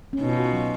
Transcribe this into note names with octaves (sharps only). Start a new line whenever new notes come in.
C#4
B2 D#4
F4
F#4
F4
F#3